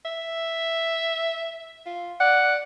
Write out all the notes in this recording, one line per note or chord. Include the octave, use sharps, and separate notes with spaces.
E5
F4
D5 F#5